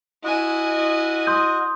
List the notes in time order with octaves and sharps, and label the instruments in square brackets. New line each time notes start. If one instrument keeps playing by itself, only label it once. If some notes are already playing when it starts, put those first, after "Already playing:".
[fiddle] E4 G#5 [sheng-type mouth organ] F#4 D#5
[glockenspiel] C6 D#6 G6